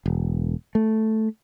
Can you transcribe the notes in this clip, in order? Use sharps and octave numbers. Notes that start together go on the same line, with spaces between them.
E1
A3